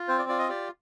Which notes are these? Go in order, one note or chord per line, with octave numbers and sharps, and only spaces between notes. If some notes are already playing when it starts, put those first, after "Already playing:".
Already playing: F4
C4 C5
D5
F4 D5
D#5
G4 D5